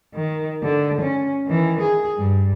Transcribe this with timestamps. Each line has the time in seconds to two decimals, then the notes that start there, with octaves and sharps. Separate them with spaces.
0.15 D#3
0.63 D3
1.02 C#4
1.46 D#3 E3
1.82 G#4
2.18 G2